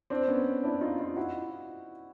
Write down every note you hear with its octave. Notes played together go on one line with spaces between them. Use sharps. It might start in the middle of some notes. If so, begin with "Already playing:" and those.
C4 D4
B3 C#4
D4 E4
D#4 F4
D#4 F4
E4 F#4